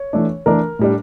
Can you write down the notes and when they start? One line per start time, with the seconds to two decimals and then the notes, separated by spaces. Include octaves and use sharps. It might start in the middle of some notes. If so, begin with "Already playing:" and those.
Already playing: C#5
0.13 E3 A3 D4
0.46 E3 A3 D4 A#4
0.79 A2 G3 D4